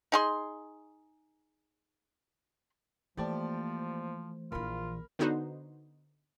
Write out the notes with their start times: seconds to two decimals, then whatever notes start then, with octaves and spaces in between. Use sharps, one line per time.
0.12 D#4 G#4 C6
3.17 E3 F3 A3 A#3 G4 C5 D5 A5
4.52 A#1 E3 F4 A#4 B5
5.19 D3 B3 D#4 F#4 C5